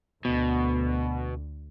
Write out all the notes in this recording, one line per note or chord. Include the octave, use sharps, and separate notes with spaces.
D2 B2